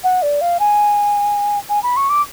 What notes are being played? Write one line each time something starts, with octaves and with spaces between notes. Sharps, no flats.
F#5
D5
F5
G#5
G#5
B5
C#6
D6